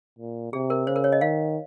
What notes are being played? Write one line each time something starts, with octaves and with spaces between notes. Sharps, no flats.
A#2
C3 G#4
A#4
C#3 C5
A#4
C#5
D#5
D#3 F5